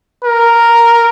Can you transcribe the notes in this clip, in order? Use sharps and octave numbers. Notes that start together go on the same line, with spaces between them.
A#4